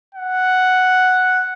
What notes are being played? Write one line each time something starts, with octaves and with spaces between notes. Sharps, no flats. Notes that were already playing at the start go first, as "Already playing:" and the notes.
F#5